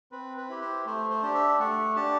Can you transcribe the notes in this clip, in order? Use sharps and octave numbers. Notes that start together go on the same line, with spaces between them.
C4 B4
B4
E4 G4
C5
A3 C5
C5
D4 G4
E5
A3 F#5
D4 G4 A5